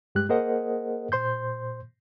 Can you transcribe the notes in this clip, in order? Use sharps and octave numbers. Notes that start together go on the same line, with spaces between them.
G2 G#3 G4 F#6
A#3 G#4 A#4 C5 D#5 F#5
A#2 C5 C6 G6